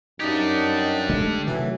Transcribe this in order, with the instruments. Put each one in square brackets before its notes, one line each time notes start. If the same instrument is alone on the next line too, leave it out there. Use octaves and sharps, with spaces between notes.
[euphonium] F#2 [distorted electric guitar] D4 G4 [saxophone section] D#4
[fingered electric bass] D3 G#3 A3
[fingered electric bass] C3 D#3 A3 [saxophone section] E3 [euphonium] F#3